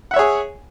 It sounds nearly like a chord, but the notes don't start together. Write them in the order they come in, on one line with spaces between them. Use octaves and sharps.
F#5 E5 C#5 G#4